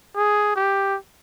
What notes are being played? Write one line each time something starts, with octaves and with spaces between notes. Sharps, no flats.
G#4
G4